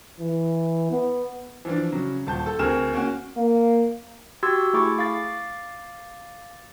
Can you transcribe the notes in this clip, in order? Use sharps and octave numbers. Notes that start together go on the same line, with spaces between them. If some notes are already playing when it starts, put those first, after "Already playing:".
E3
B3
E3 F3 D4
C#3 F#3
D#1 A5 G6
A4
D2 C4 G#4 A#4 F6 E7
A#3 C#4 F#4
A#3
F#4 G4 C6 E6 G#6
A3 E4 G#4 C#6 D6
F5 D6 A6